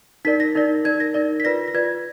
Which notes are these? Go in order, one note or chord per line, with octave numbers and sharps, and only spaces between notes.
D#4 A#4 D5 B6
A#6
D#4 A#4 D5
D#4 A#4 D5 G#6
A#6
D#4 A#4 D5
B6
F4 B4 D5 A#6
A#6
F4 B4 D5 G#6